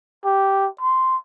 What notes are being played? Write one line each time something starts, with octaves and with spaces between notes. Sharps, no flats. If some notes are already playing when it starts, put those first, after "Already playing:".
G4
C6